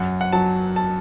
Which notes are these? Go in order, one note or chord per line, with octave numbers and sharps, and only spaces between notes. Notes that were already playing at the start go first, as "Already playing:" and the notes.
Already playing: F#2 F#5
F#5
F#3 A5
A5